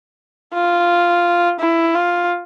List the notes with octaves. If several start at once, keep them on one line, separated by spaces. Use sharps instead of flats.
F4
E4
F4